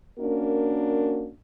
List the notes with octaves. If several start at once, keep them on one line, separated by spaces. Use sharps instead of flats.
A#3 C#4 D4 F#4 A#4